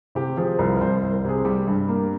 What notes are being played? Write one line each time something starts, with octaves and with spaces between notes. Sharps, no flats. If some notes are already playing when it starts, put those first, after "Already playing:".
C3 G4
F3 G#4
C2 A#4
A#4
C2 C5
C5
C2
A#4
C3 G#4
G3 G4
G2
A#3